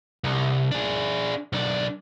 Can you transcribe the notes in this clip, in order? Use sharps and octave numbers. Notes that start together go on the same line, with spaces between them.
C2
D4 G#4
B1 D4